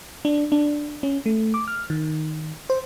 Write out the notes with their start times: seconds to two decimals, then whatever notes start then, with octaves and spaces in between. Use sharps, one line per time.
0.25 D4
0.52 D4
1.03 C#4
1.26 A3
1.54 D6
1.68 F6
1.90 D#3
2.70 C5